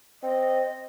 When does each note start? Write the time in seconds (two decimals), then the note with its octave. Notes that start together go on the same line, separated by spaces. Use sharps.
0.23 C4 D#5